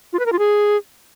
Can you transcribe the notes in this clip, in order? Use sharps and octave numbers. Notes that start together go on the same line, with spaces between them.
F4
B4
A#4
F4
G#4